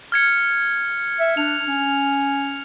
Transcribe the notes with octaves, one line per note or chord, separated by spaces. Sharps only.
F6 G#6 C#7
E5
D4 F7
C#4